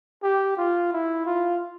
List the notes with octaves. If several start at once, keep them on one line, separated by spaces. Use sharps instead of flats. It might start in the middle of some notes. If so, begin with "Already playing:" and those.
G4
F4
E4
F4